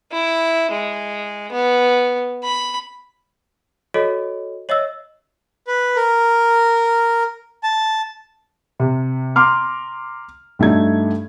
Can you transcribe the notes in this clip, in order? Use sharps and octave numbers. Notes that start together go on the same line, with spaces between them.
E4
G#3
B3
B5
F#4 A4 C#5 D#5
C#5 D#5 E5 E6
B4
A#4
A5
C3
A#5 C6 D6 F6
G2 G3 A3 D#4 F#4 G#6